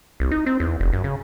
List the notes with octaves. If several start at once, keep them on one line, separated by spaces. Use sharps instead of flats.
C2
D#4
C4
E2
F1
F#2
C#3